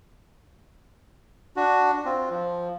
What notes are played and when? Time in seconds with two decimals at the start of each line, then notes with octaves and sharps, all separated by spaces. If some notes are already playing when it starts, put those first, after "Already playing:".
1.56 D4 F#4
2.05 C4 F4
2.30 F3